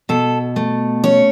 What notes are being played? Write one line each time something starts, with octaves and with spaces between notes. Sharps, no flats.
B2 A4
A3
C#4 C#5